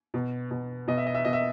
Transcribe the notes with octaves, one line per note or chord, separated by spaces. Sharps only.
B2
B2
B2 D#5
E5
D#5
E5
B2 D#5
E5